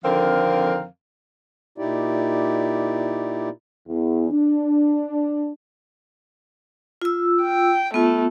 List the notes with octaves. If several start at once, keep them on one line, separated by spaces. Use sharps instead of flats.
F2 D3 D#3 C4 A#4 F5
A#2 D#4 E4 G4 D5
E2
D4
F4 E6
G5
A3 B3 F4